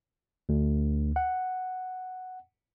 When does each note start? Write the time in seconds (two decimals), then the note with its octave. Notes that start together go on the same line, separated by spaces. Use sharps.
0.49 D2
1.16 F#5